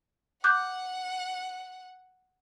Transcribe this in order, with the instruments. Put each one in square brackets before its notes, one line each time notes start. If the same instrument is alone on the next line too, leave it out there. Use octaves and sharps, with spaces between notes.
[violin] F#5 [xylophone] D6 F#6 G6